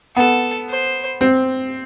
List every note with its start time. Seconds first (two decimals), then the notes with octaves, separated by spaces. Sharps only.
0.16 B3 A4
0.69 C5
1.21 C4